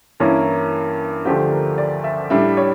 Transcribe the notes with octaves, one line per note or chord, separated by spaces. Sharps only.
G2 E3 A#3 C#4 E4 A#4
D2 D3 F3 A3 D4 G4
A#4
D5
E5
A2 G3 D4 E5
C#5